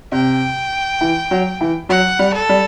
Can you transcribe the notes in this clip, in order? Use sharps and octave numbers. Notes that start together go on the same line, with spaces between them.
C3 G5
E3
F#3
E3
F#3 F#5
G3
A4
G3